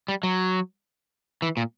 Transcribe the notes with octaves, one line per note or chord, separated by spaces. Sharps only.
G3
F#3
E3
A#2